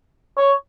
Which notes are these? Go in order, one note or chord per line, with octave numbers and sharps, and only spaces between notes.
C#5